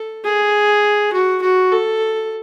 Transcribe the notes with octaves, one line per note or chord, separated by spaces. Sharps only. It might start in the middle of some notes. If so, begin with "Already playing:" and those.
Already playing: A4
G#4
F#4
F#4
A4